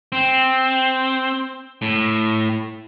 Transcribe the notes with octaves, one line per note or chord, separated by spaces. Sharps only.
C4
A2